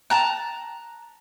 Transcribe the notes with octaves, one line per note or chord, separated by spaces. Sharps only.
A5 A#5 F#6